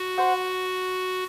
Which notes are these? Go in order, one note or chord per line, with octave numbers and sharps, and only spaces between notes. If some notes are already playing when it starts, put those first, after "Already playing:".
Already playing: F#4
C5 F#5